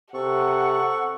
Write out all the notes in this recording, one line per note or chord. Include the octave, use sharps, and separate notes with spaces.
C3 A4 F#5 C#6